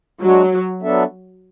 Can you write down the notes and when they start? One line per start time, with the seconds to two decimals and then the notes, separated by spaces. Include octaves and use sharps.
0.21 F#3 G#3 D4 F#4
0.82 F#3 B3 D4 A4 E5